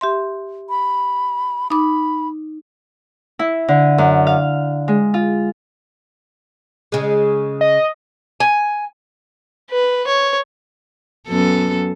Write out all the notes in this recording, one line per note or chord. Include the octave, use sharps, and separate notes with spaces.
G4 E5 C6
B5
D#4 B5 D6
E4
D3
F#2
F5
G#3
F4
C#3 G#3
D#5
G#5
B4
C#5
F#2 B3 A4